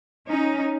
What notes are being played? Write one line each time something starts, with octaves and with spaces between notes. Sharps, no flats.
C#4 D#4